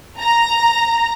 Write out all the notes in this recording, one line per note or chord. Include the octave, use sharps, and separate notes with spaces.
A#5